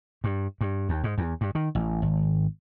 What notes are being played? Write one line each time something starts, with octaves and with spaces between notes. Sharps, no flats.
G2
G2
D#2
G#2
E2
G2
D#3
A1
G#1